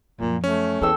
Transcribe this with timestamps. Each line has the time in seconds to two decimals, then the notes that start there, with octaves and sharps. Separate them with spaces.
0.20 F#2 A#2 F3
0.44 A3 C#4
0.81 E2 A#3 A4 G5 E6